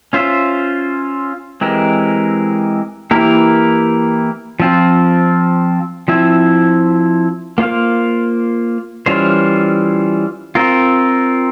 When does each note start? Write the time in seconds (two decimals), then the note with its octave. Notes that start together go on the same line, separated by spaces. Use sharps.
0.13 C#4 F4 C5 E5
1.61 E3 G#3 C4 G4 A#4
3.11 E3 A#3 E4 G4 A#4
4.60 F3 C4 F4
6.08 F3 C4 E4
7.58 A#3 F4 C5 F5
9.06 E3 G3 C#4 F4 C5
10.55 C4 F4 A#4